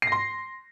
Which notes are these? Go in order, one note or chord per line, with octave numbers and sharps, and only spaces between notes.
C6 A#6 C7